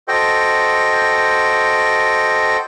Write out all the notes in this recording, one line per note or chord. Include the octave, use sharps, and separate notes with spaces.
F#4 A4 C5 D#5 G5